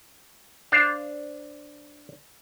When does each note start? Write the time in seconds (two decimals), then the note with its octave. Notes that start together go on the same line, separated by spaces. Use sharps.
0.72 D4 C5 F5